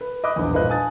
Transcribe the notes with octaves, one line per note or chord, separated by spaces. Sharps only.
B4
D#5 B5 D6 D#6 F#6
A#1 E2
G1 A#2 B4 C5 D#5 F#6
G#5 A5 D#6 A6